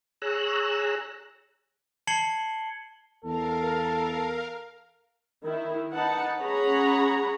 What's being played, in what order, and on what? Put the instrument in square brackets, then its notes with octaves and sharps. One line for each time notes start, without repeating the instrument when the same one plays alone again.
[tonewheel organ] G#4 C#5 A#5 E6 F#6
[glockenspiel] A5 G#6 C7 C#7 F#7 G7
[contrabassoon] E2 [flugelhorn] A4 [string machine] A#4 F5
[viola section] D#3 E4
D#4 B4 F#5 A5
C#4 G#4 C#5 F#5 A#5 B5